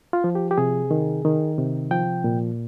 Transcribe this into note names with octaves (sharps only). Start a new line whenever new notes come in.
F4
F3
G4
G4
C3 G#4
D#3
D#3
C3
F3 G5
A#2